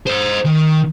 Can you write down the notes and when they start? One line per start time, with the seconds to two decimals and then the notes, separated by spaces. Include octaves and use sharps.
0.07 C5 D#5
0.45 D#3